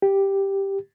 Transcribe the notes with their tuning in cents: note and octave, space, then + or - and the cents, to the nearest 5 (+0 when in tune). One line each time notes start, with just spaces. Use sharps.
G4 +0